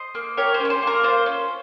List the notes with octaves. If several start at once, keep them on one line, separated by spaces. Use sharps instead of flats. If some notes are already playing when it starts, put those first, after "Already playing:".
Already playing: C5 D#5
A#3
G4 A#4 C#5
C5
C#4
C#5
C5
A#3
A#4
F4 C5
C#4